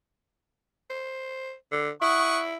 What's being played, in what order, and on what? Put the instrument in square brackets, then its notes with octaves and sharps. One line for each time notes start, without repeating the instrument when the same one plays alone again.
[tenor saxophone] C5
D3
[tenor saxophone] E4 [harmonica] F#5 C#6 D#6